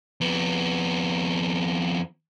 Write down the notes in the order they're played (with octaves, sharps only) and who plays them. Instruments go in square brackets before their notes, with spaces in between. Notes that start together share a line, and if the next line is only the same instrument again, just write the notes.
[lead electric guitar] F2 B3